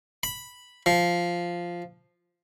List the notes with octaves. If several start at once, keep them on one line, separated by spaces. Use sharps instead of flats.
B5
F3